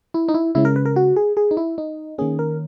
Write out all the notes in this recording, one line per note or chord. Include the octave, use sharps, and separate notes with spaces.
E4
D#4
E4
C#3 G#3 C#4 E4
A#4
B4
A#4
F#4
G#4
G#4
D#4
E4
D#4
D#3 A#3 C#4 G#4
A#4